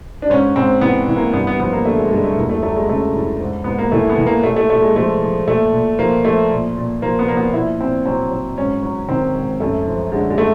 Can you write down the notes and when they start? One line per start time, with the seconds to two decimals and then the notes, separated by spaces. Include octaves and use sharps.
0.22 D4
0.30 G#2 C#4
0.56 G#2 C4
0.81 E3 B3
1.08 E3
1.16 A#3
1.33 G2 B3
1.47 B3
1.60 F3 B3
1.72 A#3
1.85 D3 A3
1.98 G#3
2.11 G2 G#3
2.24 A3
2.37 E2 A#3
2.49 A3
2.62 F#3 A3
2.76 G#3
2.89 C#3 A3
3.15 E2
3.40 G#2
3.64 G#2 B3
3.78 A#3
3.92 E3 A3
4.09 B3
4.18 E3
4.27 A#3
4.43 A#2 A3
4.56 A3
4.70 A#2 A3
4.82 G#3
4.96 F3 A3
5.21 F3
5.47 A#2 A3
5.73 A#2
5.99 F3 A#3
6.24 F3 A3
6.51 A#2
6.77 A#2
7.02 F3 A#3
7.19 B3
7.28 F3 A#3
7.37 B3
7.53 A#2 E4
7.80 A#2 C4
8.06 F#3 C4
8.31 F#3
8.57 G#2 C#4
8.83 F#3
9.09 D#3 C4
9.35 G#2
9.60 F#2 A3
9.87 F3
10.12 D3 G#3
10.30 G#3
10.38 A3